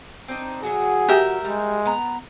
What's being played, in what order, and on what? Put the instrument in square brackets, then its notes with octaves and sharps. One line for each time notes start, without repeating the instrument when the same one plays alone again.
[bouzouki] C4 D4 D#4
[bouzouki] D3 F#3 F#4 [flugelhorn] G#4
[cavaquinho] G4 A#4 E5
[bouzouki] G3 [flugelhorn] G#3
[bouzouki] B3 A#5